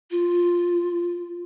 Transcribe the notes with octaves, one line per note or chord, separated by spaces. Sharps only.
F4